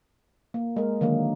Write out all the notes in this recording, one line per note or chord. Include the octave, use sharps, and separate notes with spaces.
A#3
G#3 A#4
D3 D#3 F#3 A#3